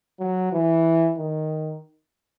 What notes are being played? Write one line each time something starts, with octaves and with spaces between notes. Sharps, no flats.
F#3
E3
D#3